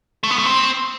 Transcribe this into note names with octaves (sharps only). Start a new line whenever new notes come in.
A3
B3
A3
C4